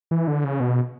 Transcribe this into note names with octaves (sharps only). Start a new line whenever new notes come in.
E3
D3
C#3
B2